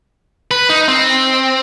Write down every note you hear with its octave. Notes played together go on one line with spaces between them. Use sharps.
B4
D#4
C4